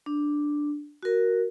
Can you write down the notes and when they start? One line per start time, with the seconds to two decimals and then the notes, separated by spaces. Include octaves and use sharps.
0.06 D4
1.03 F#4 A#4